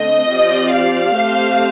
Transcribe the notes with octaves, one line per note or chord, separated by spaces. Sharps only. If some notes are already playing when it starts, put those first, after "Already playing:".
Already playing: D3 A3 C4 D#5
F3 C4 G4 D5
F5
A3 C4 G4 C5